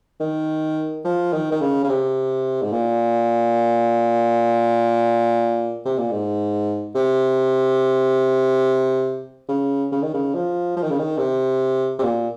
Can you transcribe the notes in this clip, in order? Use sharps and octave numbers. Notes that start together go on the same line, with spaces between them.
D#3
F3
D#3
D#3
C#3
C#3
C3
G#2
A#2
C3
A#2
G#2
C3
C#3
C#3
D#3
C#3
F3
F3
D#3
C#3
D#3
C3
C3
A#2